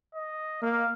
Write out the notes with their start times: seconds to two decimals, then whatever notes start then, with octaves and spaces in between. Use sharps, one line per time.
0.14 D#5
0.62 A#3 F5